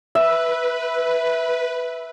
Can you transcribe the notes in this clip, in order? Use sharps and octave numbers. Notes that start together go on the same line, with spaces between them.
B4 E5